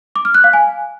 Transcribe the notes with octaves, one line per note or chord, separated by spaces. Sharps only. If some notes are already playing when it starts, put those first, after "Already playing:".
D6
F6
F#6
F5
G#5